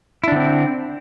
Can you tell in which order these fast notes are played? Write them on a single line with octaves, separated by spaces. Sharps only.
E4 D4 D3 C4